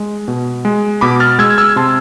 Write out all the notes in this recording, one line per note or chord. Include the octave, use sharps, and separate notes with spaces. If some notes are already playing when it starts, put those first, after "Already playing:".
Already playing: G#3
B2
G#3
B2 B5 D6
F6 A6
G#3 E6 G#6
E6 G#6
C3 A5 C6